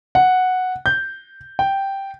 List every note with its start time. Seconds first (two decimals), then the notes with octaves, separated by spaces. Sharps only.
0.15 F#5
0.86 G6
1.59 G5